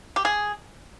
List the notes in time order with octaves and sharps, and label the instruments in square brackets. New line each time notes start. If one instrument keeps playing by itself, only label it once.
[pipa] G4
G#4